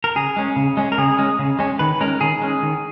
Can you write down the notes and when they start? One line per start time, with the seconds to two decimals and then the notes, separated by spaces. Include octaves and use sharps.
0.04 A#4
0.16 C#3 G#4
0.36 G#3 C#4
0.56 C#3
0.77 G#3 C#4
0.92 A#4
0.98 C#3 G#4
1.18 G#3 C#4
1.39 C#3
1.59 G#3 C#4
1.79 D#3 B4
2.01 G#3 C#4 A#4
2.21 D#3 G#4
2.42 G#3 C#4
2.63 D#3